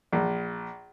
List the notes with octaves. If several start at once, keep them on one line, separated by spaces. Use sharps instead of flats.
A#1